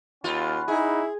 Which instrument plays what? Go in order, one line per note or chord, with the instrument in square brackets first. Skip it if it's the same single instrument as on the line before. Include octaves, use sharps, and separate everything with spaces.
[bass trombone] D#2 [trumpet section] C#4 F#5 B5 [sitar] F4
[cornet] D#4 [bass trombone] E4 [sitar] G#4